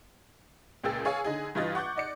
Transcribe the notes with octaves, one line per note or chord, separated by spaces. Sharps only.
C#2 A#2 G#4 G5 E6 A6
G#4 C#5 F5 G#5
D3 D#4 G#4
G2 E3 F4 D#5 A6
F#5 C#6 D6 F#6 G6
D#4 D5 C#7